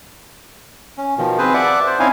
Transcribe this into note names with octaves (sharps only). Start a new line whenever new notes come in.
C#4
B2 D#3 F3
C4 G#4 B4 C5
D5 E5 F#5 A5 D6
C5
C4 C#4 D#4 E4 F5 G#5